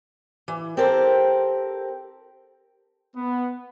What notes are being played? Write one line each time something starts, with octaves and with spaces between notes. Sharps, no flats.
E3
C4 G4 A4 A#4 C5
B3